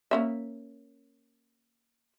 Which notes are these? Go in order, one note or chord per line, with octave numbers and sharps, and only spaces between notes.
A#3 C#4 E5